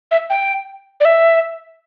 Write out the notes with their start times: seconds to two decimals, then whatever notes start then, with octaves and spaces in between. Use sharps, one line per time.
0.11 E5
0.30 G5
1.00 D5
1.05 E5